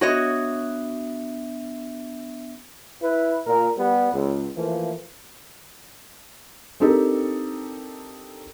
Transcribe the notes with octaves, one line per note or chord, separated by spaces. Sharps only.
B3 D4 F#4 C#5 D#5 E5
E4 B4
A#2 A#4
G3 B3
C#2
E3 F3 A3 A#3
C4 D4 D#4 G4 A4 A#4